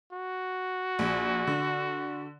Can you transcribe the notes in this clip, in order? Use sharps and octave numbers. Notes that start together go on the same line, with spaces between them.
F#4
A#1
D3